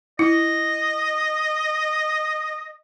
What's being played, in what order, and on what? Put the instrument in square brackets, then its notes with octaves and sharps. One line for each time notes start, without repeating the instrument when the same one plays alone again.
[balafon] E4 [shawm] D#5